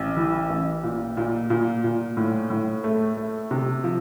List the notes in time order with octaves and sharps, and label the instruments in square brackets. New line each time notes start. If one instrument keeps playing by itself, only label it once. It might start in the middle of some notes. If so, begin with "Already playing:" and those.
Already playing: [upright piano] A1
E3
A1
A#2
A#2
A#2
A#2
A2
A2
A3
A3
C3
F3